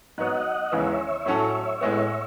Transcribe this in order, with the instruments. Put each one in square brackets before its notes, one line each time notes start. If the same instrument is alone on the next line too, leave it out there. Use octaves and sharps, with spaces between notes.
[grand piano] G#2 F#3 B3 F#4 C#5 [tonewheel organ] D#5 F#5
[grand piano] D#2 C#3 E3 G#3 B3 [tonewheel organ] C#5 E5
[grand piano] A2 F#3 C#4 F#4 A4
A2 G#3 B3